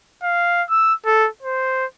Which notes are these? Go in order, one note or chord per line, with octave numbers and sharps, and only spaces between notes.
F5
E6
A4
C5